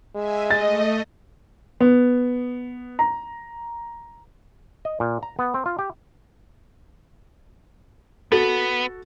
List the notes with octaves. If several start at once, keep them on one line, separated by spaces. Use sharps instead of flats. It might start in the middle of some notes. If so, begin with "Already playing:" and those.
G#3 E5 G#5
A3 D#5 A6
B3
A#5
D#5
A#2
A#5
B3
C4
F4
G4
B3 F#4 A4 A6